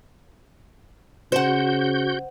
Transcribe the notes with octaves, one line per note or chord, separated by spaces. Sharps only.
C#3 F#4 C5 F#5 G6